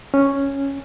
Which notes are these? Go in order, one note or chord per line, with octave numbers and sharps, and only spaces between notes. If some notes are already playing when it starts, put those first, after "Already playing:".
C#4